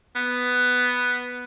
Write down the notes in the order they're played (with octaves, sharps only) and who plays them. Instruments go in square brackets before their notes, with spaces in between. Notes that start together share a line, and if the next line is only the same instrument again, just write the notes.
[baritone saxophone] B3